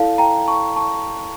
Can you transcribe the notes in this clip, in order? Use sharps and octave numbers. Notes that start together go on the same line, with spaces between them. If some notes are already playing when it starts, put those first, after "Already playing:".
Already playing: E4 A4 D5 F5 A5
G5 A#5
A5 C#6
A5 C#6